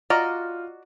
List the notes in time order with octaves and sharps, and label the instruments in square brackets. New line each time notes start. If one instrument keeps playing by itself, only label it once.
[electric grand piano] F4 [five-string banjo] F#4 D5 D#5 [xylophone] A#5 [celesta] F6